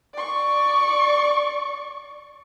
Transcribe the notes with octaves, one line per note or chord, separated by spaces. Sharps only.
D5 C#6